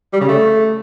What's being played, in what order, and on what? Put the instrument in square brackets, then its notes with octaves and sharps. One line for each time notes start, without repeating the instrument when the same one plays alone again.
[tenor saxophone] G3
C#3
A3